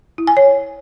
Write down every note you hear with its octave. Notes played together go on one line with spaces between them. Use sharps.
E4
G#5
C#5